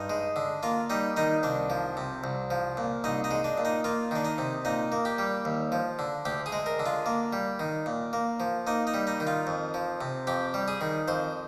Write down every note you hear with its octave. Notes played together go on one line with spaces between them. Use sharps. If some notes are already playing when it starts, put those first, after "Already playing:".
Already playing: G2 D#4
G#3
D3
A#3 F4
G3 D#4
D#3 D#4
C2 D4
F3
C3
C2
F3
A#2
C2 D#4
D#4
G#3
D4
A#2
D#4
A#3 F4
D#3 D4
D#4
C3
A#2 D#4
A#3
G4
G3
D#2
F3
D3
D2 G4
G#4
G#3
A#4
D3
F4
A#3
G3
D#3
A#2
A#3
F3
A#3 D#4
D#4
G3
D#4
D#3
F4
F2
F3
C3
F2 G4
G3
G#4
D#3
F2 C5